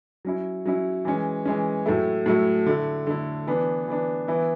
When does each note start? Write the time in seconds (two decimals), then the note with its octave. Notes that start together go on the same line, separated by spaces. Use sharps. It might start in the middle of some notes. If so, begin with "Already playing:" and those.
0.25 F#3 C#4 E4
0.65 F#3 C#4 E4
1.05 E3 G#3 C#4
1.45 E3 G#3 C#4
1.86 A2 F#3 A3 E4
2.26 A2 F#3 A3 E4
2.66 D3 A3 E4
3.07 D3 A3 E4
3.47 E3 B3 D4
3.88 E3 B3 D4
4.28 E3 B3 E4